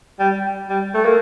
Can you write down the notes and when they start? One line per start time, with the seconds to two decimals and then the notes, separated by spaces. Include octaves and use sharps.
0.19 G3
0.69 G3
0.94 A3
1.05 A#3